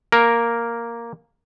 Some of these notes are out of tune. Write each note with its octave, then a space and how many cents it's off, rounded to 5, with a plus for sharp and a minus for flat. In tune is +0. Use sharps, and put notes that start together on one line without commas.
A#3 +0 A#4 +0